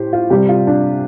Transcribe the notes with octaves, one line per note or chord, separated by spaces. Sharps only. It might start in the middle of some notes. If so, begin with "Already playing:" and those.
Already playing: A2 G4 C5
F4
C3 G3 G4
F4
D4